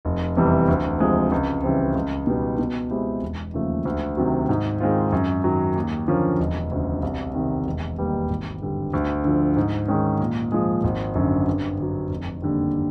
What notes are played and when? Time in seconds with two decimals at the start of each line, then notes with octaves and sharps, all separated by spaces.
0.05 F1
0.37 E2 C3 E3 G3
0.68 D2
1.00 C3 F3 G#3 C4
1.32 C#2
1.63 C#3 E3 G3 C4
1.95 C#2
2.27 B2 G3 B3 D#4
2.59 B2
2.91 G#3 C4 E4 G4
3.22 E1
3.54 D#2 C#3 F3 A3
3.85 D2
4.17 C3 D#3 F#3
4.49 G#2
4.80 D#3 G#3 C4 F4
5.12 F#2
5.44 D#3 F#3
5.76 D#2
6.07 D3 F3 A#3 C#4
6.40 E1
6.71 D2 C#3
7.02 C2
7.34 C3 D#3
7.66 E1
7.98 D#2 D#3 G3 B3
8.30 G#1
8.62 G2 D3 G3
8.93 D2
9.24 D3 F3
9.56 G#2
9.88 D#3 G#3 C#4
10.20 A#2
10.52 F3 G#3
10.84 G#1
11.15 F#2 D3
11.47 G2
11.79 D3 F#3
12.10 F1
12.42 D#2 D3 G3